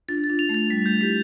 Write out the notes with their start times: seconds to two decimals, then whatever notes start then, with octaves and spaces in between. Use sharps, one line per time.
0.09 D4 F4 A6
0.24 A6
0.29 D4 F4
0.39 F7
0.49 A3
0.54 A6
0.70 G3 B6
0.86 A3 G6
1.01 E4 G4 B6